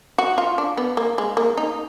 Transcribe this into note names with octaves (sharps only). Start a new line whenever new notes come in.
F#4
F4
D4
B3
A#3
G#3
A#3
D#4